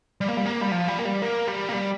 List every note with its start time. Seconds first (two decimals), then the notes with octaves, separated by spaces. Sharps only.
0.21 G3
0.28 A#3
0.37 G3
0.45 A#3
0.61 G3
0.71 F3
0.88 G3
0.99 A#3
1.05 G3
1.22 A#3
1.47 G3
1.69 A#3
1.73 G3